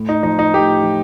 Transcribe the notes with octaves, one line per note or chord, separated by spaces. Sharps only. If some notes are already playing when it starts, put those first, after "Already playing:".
Already playing: A2
D#4
F3 D#4
D#4
A2 G4
F3